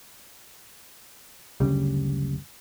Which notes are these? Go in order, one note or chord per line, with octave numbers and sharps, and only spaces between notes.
F#1 D2 C#3 G3